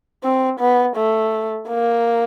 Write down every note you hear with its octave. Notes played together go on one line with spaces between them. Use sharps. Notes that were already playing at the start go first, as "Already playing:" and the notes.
C4
B3
A3
A#3